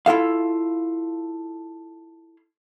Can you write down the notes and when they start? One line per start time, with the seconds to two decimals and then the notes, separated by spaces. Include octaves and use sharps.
0.06 E4 F4 A4 F5